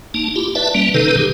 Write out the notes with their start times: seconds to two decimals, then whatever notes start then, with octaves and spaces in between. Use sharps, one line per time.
0.14 A#3 D#4 A5
0.36 E4 F4 G4
0.55 B4 D5 E5 A5
0.75 G3 A#3 C#4
0.94 C3 D#3 D#4 A4 B4
1.18 G4 G#4